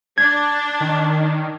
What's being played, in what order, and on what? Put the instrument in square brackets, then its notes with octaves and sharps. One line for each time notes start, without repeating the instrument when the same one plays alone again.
[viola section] D4 [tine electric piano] G#6
[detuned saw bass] D#3